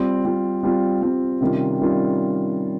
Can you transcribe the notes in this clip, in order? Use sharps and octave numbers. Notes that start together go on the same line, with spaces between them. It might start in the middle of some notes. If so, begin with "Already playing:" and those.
Already playing: G3 C4 F4
G3 C4 F4
G3 C4 F4
G3 C4 F4
C3 D#3 G3 C#4 F4
C3 D#3 G3 C#4 F4